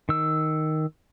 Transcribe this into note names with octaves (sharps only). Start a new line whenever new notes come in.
D#3 E6